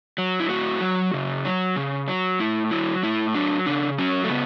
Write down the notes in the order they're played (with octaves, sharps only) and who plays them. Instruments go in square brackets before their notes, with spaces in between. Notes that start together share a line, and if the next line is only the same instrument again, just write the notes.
[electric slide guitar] F#3
E4
A2 F#4
F#3
C#3
F#3
C#3
F#3
A2 E4
F#3 E4
A2 E4
F#3 D4
C#3 D4
F#3 C#4
A3
C#3 B3